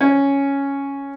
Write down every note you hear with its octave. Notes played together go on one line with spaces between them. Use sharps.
C#4